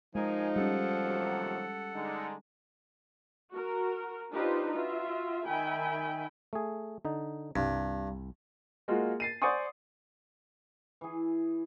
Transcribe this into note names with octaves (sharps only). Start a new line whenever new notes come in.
F3 G#3 D#4 G#4 A#4 G#5
G3 C#4 A4 F#5
D#2 C3 F#3
D3 G#3 D#4
F#4 A#4
D4 D#4 F4 G4 B4 C5
F4 F#4 E5
D#3 E5 G5 G#5 B5
A3 G#4
D3 D#4
C2 G2
G#3 A#3 F4 F#4
A6 C7 D#7
C5 D5 F#5 G#5 C#6 D#6
E3 G#4